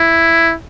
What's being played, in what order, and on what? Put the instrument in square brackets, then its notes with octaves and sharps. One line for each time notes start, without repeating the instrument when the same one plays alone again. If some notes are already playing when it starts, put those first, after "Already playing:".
Already playing: [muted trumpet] E4